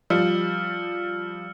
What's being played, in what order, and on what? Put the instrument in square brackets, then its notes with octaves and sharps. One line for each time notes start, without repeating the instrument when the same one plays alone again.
[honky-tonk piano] F3 G3 [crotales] E6 F6 C#7